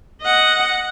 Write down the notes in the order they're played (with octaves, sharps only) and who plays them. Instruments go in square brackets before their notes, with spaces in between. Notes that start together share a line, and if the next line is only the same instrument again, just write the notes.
[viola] D#5 F#5